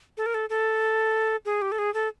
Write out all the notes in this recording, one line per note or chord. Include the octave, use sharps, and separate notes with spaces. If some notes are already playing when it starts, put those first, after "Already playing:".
A4
A#4
A4
A4
G#4
G4
A4
G#4
A4